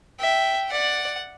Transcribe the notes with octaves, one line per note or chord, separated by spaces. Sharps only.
E5 G5
D5 F#5